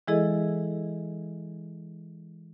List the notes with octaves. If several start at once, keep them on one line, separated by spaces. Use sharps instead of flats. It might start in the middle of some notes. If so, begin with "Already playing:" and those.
E3 G#3 E4 G#4 A4 D#5